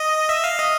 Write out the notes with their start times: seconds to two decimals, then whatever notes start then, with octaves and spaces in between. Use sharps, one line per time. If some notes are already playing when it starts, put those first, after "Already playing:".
Already playing: D#5
0.29 E5
0.44 F5
0.59 D#5